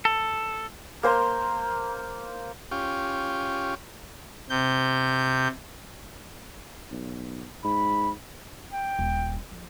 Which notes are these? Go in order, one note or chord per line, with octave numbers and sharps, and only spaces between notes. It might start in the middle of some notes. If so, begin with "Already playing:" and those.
A4
A#3 C5 A#5 C6
C#4 F4 G4
C3 G6
B1
G#2 B5
G5
D#1
F3